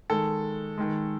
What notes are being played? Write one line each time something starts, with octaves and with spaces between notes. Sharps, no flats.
D#3 G#3 A4
D#3 G#3